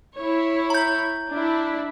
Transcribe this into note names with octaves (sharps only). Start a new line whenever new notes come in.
E4 C#5
A#5 G6
D4 E4